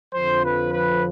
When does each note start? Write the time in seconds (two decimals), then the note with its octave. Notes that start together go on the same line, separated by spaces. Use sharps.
0.14 F2 D3 F3 C5
0.44 B4
0.73 B4